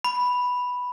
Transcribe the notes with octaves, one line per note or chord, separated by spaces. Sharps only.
B5